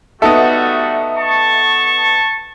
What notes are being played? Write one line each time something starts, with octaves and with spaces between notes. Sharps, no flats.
G3 A3 B3 D#4 F#4 A4 E5
A5 C#6